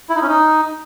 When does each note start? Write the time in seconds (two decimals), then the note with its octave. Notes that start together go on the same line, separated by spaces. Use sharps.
0.10 E4
0.16 D#4
0.22 C#4
0.28 D#4